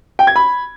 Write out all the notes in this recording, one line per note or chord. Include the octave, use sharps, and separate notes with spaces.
G5
G#6
B5